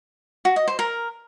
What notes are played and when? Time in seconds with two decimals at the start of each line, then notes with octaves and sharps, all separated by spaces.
0.45 F#4
0.56 D#5
0.68 C5
0.79 A#4